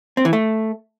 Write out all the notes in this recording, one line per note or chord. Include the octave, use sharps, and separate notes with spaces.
C4
E3
A3